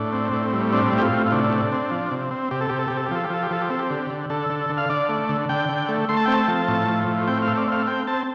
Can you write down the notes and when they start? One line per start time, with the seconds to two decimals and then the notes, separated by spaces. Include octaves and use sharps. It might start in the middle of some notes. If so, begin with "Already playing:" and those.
Already playing: A2 D4
0.13 C4
0.33 A2
0.53 G3
0.73 C4 D4
0.92 A2
0.98 G4
1.02 F4
1.12 A2
1.27 F4
1.32 C3 D4
1.52 C3
1.72 C4
1.91 F3
2.11 C3
2.31 C4
2.51 C3 G4
2.61 A4
2.69 C3 G4
2.79 A4
2.88 C3 G4
2.97 A4
3.06 G4
3.11 F3 A4
3.24 G4
3.30 F3 A4
3.43 G4
3.51 F3 A4
3.61 G4
3.70 C4 A4
3.79 G4
3.90 D3
4.10 D3
4.30 D3 A4
4.50 D3
4.70 D3
4.78 F5
4.90 D3 D5
5.09 A3
5.29 D3
5.49 D3 G5
5.69 D3
5.89 A3
6.09 A3 C6
6.17 A5
6.26 C4 G5
6.34 A5
6.48 F3
6.68 A2
6.88 F3
7.07 A2
7.28 C4 G5
7.42 A3 F5
7.57 D5
7.68 C4 F5
7.87 C4 G5
8.07 C4 A5